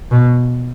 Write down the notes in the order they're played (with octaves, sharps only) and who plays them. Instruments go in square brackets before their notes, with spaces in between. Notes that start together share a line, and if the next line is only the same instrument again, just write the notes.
[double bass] B2